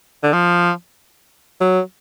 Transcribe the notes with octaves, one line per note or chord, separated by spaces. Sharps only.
D3
F3
F#3